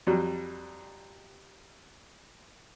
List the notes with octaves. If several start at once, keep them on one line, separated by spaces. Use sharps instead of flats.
F2 F#3 G3